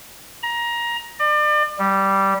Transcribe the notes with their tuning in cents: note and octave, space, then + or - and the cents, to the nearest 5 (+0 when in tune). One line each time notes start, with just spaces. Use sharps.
A#5 +20
D5 +35
G3 -10